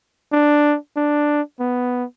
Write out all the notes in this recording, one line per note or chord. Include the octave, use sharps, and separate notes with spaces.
D4
D4
B3